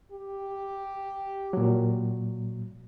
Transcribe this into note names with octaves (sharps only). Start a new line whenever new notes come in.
G4
A#2 F#3